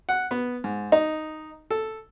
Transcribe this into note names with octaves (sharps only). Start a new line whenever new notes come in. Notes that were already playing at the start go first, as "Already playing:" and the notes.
F#5
B3
G#2
D#4
A4